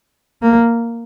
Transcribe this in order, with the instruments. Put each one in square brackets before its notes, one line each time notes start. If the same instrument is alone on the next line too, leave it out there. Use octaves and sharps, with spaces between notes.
[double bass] A#3